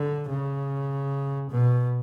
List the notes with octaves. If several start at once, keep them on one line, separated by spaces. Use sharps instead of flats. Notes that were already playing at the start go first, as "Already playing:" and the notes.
Already playing: D3
C#3
B2